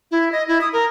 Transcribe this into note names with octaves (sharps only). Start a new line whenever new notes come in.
E4
D#5
E4
D#6
A#4